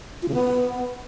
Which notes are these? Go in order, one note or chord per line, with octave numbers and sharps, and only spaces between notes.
F4
C#3
B3